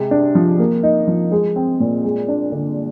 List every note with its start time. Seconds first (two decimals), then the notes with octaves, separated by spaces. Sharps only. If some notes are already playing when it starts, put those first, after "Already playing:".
Already playing: C3 G#3
0.11 D4
0.35 F3
0.59 A#3
0.83 D#4
1.07 F3
1.32 G#3
1.56 C4
1.80 A#2
2.04 G#3
2.28 D4
2.52 D3